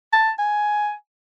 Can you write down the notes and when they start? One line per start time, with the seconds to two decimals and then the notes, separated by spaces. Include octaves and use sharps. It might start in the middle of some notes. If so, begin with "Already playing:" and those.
0.13 A5
0.39 G#5